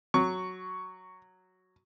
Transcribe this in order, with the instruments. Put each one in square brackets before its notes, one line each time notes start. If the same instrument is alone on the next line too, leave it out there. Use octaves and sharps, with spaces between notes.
[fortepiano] F#3 [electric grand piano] C#6